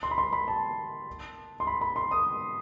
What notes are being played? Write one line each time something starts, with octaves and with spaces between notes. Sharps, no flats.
C6
B5
C6
B5
A5
C6
B5
B5
C6
D#6